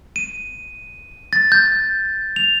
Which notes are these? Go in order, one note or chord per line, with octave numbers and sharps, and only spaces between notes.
D#7
A6
G6
F7